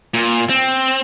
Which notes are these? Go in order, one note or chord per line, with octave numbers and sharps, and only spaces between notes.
A#2
C4